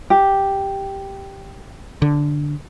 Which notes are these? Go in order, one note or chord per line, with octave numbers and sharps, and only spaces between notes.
G4
D3